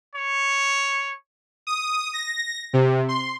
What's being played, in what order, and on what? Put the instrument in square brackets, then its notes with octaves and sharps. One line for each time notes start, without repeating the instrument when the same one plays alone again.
[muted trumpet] C#5
[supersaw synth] D#6
A#6
C3
C6